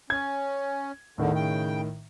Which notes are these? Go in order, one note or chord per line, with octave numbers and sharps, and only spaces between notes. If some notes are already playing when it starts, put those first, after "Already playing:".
C#4 G#6
E2 A2 D3 D#3
C#3 G5